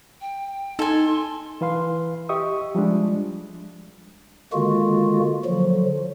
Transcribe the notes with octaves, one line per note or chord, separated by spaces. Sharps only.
G5
D#4 A4 G#5 C6
E3 B4 F5 C6
G4 D#5 E5 C#6 D#6
F3 G3 G#3 D4
D3 D#3 G#3 A#3 F4 F#4
D3 F3 F#3